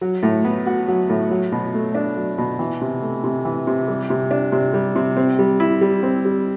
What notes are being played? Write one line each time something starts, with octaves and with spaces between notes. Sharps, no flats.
F#3
A2
B3
F#4
F#3
A2
F#3
B2
A3
D4
F#3
B2
E3
C3
A3
C3
E3
C3
G3
C3
D4
C3
G3
C3
C4
G3
E4
G3
C4
G3